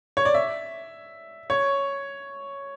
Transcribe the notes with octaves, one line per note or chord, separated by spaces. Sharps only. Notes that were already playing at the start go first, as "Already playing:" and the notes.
C#5
D5
E5
C#5